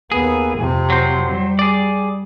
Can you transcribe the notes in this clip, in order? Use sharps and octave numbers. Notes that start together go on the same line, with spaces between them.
D#2 B3 G#4
F2 C3
F#3 C5
G3
G#4 D5